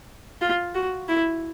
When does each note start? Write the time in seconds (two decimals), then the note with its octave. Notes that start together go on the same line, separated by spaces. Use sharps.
0.41 F4
0.75 F#4
1.08 E4